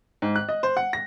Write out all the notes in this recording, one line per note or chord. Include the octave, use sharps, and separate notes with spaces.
G#2
F#6
D#5
C5
F#5
A#6